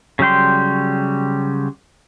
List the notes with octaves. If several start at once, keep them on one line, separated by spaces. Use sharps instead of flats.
C#3 F#3 G3 G5 C6